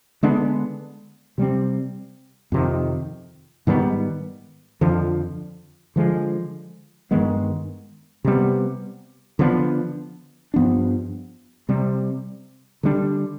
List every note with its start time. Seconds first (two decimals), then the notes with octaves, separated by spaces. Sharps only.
0.23 D3 G#3 B3 D4
1.38 C3 G3 C4
2.52 F2 C3 D#3
3.67 G#2 D#3 G3 B3
4.81 F2 D3 F3
5.96 D3 F3 G#3
7.11 G2 D#3 G#3 B3
8.24 C3 G3 B3
9.39 D3 F3 B3 D4
10.54 G2 F3 B3 D4
11.69 C3 G3 C4
12.83 D3 G3 D4